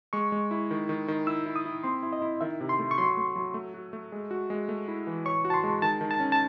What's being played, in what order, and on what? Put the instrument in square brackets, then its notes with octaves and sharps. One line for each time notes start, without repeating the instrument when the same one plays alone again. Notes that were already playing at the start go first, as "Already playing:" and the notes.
[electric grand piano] G#3 [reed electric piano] C#6
[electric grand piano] G#3
E4
D#3
D#3
D#3
[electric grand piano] E4 [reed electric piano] E6
[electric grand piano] E4
[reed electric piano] D#6
[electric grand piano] E4
[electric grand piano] C4 [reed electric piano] C6
[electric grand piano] E4
[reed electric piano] D#5
[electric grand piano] E4
[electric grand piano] D#3 [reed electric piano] E5
[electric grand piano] C3
[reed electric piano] C6
[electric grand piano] A3
[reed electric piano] C#6
[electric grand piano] F#3 [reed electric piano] C6
[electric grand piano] A3
F#3
A3
F#4
A3
G#3
F#4
G#3
A3
E4
E3
[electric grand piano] C#5 [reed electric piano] C#6
[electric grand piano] F#4
[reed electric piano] A5
C6
[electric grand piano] G#3
[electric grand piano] D#3 [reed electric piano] A5
[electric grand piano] D#3
[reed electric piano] A5
[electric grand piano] C#4
[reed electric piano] A5